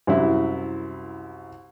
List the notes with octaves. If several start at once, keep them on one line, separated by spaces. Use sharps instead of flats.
C2 F#2 E4